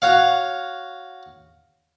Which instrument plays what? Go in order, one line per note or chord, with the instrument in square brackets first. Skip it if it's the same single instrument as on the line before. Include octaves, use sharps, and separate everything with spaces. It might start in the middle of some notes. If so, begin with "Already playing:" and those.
[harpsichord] F#4 C#5 F5